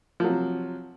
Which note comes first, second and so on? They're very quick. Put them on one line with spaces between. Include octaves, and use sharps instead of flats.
F3 F#3 C3